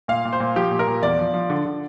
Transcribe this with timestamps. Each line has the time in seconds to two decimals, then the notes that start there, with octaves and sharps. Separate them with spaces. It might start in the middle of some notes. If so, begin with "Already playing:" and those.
0.08 A#2 F5
0.25 A#2
0.33 C5
0.40 A#2
0.56 F3 G4
0.71 A#2
0.79 A#4
0.88 A#2
1.02 E2 D5
1.19 F3
1.34 F3
1.50 D3
1.65 D3